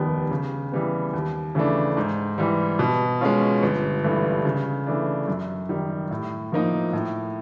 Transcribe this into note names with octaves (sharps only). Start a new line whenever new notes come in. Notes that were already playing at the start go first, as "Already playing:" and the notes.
Already playing: F1 D#2 D#3 G3 B3
C#3
E3 G3 B3
D#2
C#3 E3 A3 D4
G#2
E3 G3
B2
G#3 C#4 F4
G1
G2 E3 A3
C#3
E3 A3 D4
F#2
D#3 G3
A2
F3 A#3 D#4
A2